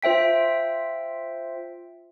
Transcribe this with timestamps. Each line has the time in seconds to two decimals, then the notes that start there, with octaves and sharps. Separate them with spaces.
0.03 F4 C5 E5 G5 B6